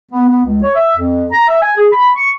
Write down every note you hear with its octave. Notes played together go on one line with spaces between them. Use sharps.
B3
B3
C#2
C#5
E5
F2
A#5
E5
G#5
G#4
B5
C#6